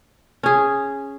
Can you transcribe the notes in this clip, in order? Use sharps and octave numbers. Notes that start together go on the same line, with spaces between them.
C#4 G#4